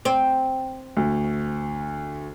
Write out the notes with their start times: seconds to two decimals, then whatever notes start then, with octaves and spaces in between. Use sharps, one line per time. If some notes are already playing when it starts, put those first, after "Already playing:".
0.05 C4
0.97 D2